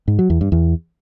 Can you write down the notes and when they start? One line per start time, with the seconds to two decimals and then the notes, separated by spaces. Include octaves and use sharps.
0.08 G#2
0.19 F#3
0.30 E2
0.41 G2
0.52 E2